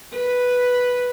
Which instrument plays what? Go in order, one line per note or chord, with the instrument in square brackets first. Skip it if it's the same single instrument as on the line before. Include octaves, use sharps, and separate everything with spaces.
[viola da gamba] B4